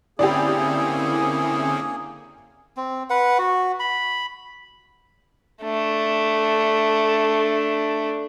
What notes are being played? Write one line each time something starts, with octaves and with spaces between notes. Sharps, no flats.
D3 A#3 C4 C#4 E4 G4 G#4 D5
C4
B4 F#5
F#4
B5
A3 D4